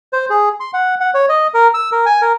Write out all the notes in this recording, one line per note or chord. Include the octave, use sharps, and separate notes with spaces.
C5
G#4
C6
F#5
F#5
C#5
D#5
A#4
E6
A#4
G#5
A#4